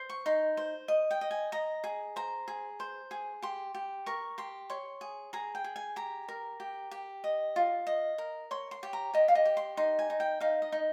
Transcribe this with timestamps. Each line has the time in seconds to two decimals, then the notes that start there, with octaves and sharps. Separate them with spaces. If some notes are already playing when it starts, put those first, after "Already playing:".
Already playing: C5
0.10 C#6
0.26 D#4 C6
0.57 C5
0.88 D#5
1.11 G5
1.21 D#5
1.31 G#5
1.52 D#5 A#5
1.84 G#4
2.16 C5 A#5
2.48 G#4
2.80 C5
3.11 G#4
3.42 G4 C6
3.75 G4
4.06 A#4 C#6
4.38 G4 C6
4.70 C#5 C6
5.01 G#4
5.33 G#4 A#5
5.55 G5
5.64 G#4
5.76 G#5
5.96 G4 A#5
6.29 A#4
6.60 G4
6.91 G4
7.24 D#5
7.56 F4
7.87 D#5
8.18 A#4
8.51 C#5 C6
8.71 C6
8.83 G4
8.93 A#5
9.14 G4 D#5
9.28 F5
9.35 D#5
9.45 G4
9.57 C6
9.77 D#4 C6
9.99 G#5
10.10 D#4
10.20 G5
10.40 D#4 F5
10.62 D#5
10.72 D#4